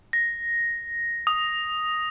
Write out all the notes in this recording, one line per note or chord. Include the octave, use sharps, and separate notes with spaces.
A#6
D#6